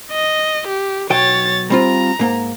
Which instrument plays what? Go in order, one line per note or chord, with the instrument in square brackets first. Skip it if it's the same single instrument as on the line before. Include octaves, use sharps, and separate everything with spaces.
[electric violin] D#5
G4
[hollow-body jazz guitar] B1 F#3 G5 [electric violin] C#5 A6
[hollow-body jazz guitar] G3 C4 F4 [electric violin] A#5
[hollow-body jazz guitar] G#2 A#3